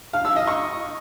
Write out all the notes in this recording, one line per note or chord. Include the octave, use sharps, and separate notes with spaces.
F5
E6
D#5
C#6